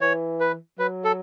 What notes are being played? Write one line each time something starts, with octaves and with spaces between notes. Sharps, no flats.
E3 C#5
B4
F#3 B4
A4